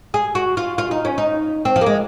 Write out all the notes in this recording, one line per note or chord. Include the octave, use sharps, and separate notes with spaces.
G#4
F#4
F4
F4
D#4
C#4
D#4
C4
F3
A#3
G#3